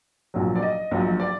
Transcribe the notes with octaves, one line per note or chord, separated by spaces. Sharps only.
A#1 A#2 F#3
D5
D#5
A#1 A#2 F#3
D5